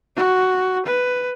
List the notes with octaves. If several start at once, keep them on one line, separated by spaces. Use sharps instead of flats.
F#4
B4